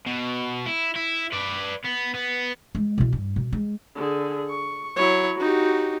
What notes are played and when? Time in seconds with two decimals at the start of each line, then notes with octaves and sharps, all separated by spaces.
0.07 B2
0.66 E4
0.95 E4
1.33 B4 D5
1.85 B3
2.15 B3
2.75 G#3
2.98 B2 E4
3.12 G2
3.36 B2
3.52 G#3
3.96 D3 G#4
4.49 C#6
4.96 F#3 E4 C#5
5.40 D#4 F#4 G4